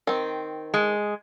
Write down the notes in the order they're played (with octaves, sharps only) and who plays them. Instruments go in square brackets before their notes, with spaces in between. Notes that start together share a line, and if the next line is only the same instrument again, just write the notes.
[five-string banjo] D#3 C4
[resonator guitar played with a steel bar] G#3